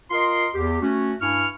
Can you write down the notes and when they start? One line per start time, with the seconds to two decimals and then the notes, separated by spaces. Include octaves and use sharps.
0.11 F4 A#4 D#5 C6
0.54 E2 G4
0.81 A3 C#4 F#4
1.21 G2 E4 G#5 C#6 F6